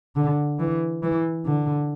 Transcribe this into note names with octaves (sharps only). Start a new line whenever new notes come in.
D3
E3
E3
D3